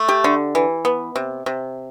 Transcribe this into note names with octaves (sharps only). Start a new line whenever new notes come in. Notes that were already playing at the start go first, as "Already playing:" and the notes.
Already playing: A3
G4
D3
E3
B3
C3
C3